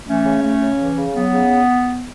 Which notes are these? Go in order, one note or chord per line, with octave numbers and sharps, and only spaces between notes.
E3 A3 C#4
C#3
A3
C#3
E3
C#3
F#3 B3
C#3